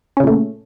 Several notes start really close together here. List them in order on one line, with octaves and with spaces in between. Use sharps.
C#4 C#3 A#2 A3